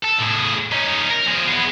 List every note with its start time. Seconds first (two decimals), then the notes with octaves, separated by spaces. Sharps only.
0.04 A4
0.20 A2 G#4
0.72 C#4 D#4
1.11 A#4
1.27 F3 G#4
1.48 B3 G#4